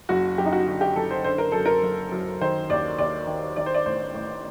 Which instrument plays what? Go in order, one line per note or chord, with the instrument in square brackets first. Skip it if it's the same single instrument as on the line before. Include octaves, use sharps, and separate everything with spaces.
[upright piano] F#1 F#4
F#2 G4
D#4
F#4
D3 F#4
G4
F#1 A4
C5
D3 C5
A#4
F#2 A4
A#4
F#1
F#2
D#3 C5
D#2 D5
D#2 D5
D#3
D#3 D5
C5
D5
A1 C5
A1